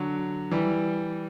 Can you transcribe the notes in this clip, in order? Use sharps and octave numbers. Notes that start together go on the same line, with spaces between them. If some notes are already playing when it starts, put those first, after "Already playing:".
Already playing: D3 F#3
E3 G3